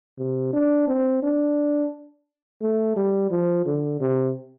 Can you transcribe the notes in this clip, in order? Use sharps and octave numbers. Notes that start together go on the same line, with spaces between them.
C3
D4
C4
D4
A3
G3
F3
D3
C3